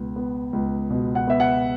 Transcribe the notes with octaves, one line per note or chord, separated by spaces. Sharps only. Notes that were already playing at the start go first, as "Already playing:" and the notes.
Already playing: C#2 B2 B3
B3
C#2
B2
F#5
B3 E5
F#5